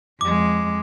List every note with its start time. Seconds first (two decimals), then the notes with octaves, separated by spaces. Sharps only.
0.21 F2 G#3 D6